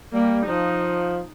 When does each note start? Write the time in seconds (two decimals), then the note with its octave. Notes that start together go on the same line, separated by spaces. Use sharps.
0.13 G3 A#3
0.47 F3 D#4